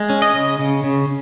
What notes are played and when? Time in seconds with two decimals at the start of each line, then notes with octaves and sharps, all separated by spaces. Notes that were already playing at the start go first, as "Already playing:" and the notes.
Already playing: G#3
0.10 C#4
0.22 D#5
0.34 C#3
0.59 C#3
0.84 C#3